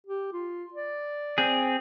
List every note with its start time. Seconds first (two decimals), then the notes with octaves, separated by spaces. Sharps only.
0.06 G4
0.33 F4
0.73 D5
1.38 C4 G#4